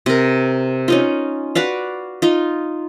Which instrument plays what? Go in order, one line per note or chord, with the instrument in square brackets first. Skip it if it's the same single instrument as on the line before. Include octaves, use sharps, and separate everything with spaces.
[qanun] C3 A#4
C#4 D#4 F4
F#4 B4 D5 F5
D#4 F4